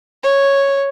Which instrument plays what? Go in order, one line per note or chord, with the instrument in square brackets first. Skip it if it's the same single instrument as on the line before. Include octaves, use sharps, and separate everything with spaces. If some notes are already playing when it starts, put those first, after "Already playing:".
[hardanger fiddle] C#5